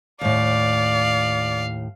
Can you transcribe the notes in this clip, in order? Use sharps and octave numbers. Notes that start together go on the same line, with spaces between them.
D#2 A2 D5 F5